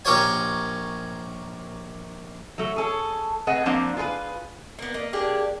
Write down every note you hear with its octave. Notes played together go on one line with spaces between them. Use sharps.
A#1 G4 A#4 C#5 G#5
F#3 A3
G#4 A4 C#5
A3 C4 G#4 B4 D#5 F#5
F3 A#3 C4 D4 C5 F5
F4 G#4 A#4 B4
A#3 B3
A#3 D#5
A#3 D4 G4 G#4